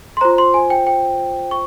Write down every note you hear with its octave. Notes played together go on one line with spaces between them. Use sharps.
C6
F4 C5 A#5
C6
G#5
G5
G5
C#6